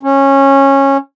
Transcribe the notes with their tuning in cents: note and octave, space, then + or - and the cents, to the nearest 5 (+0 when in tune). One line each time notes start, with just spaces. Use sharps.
C#4 -15